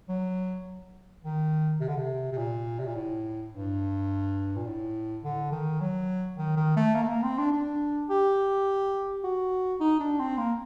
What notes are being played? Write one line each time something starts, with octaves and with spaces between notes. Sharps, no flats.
F#3
D#3
C3
D3
C3
C3
A#2
C3
A#2
A2
G2
A#2
A2
D3
D#3
F#3
D#3
D#3
A3
A#3
A3
A#3
C4
D4
D4
G4
F#4
D#4
D4
C4
A#3